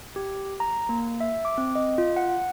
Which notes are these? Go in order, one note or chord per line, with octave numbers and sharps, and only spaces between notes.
G4
A#5
A#3
E5
D6
C4
D#5
F4
F#5